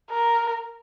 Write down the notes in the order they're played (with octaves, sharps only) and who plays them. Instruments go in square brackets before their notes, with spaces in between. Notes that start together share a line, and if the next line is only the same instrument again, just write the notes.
[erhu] A#4